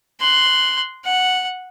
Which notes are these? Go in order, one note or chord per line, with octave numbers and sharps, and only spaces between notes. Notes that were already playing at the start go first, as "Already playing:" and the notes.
C6 F#6
F#5